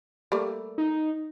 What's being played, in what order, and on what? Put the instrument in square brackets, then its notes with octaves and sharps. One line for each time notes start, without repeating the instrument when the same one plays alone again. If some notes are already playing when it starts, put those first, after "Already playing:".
[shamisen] G3 A3 A#3
[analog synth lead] D#4